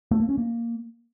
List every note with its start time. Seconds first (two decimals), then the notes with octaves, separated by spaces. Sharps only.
0.11 A3
0.20 A#3
0.29 C#4
0.38 A#3